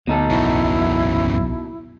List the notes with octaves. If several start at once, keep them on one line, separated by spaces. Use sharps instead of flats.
D2 B2 D#4 A4
D1 B1 F#2 E3 E4